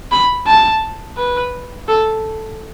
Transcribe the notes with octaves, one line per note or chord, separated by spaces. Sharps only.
B5
A5
B4
A4